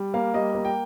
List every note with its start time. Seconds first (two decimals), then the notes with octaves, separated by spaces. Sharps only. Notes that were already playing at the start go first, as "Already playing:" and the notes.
Already playing: G3
0.14 A#3 F5
0.34 G3 D#5
0.55 A#3
0.65 G5